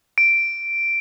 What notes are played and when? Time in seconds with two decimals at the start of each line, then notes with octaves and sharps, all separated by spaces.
0.18 D7